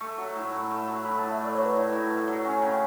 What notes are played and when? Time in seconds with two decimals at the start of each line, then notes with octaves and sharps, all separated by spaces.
0.01 A3 C#6
0.18 F#3
0.36 A2
0.53 A2
0.70 A3
0.88 F#3
1.05 A2 B5
1.19 A2 A5
1.31 E5
1.40 A3 D5
1.55 F#3 C#5
1.65 B4
1.74 A2 C#5
1.92 A2
2.10 A3
2.28 F#3
2.45 C#4
2.62 C#3 G5